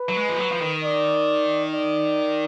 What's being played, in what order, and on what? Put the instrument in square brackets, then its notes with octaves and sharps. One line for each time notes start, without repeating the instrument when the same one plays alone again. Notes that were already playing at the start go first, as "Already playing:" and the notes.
Already playing: [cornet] B4
[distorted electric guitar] F#3
G#3
F3
F#3
F3
D#3
[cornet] D5
D5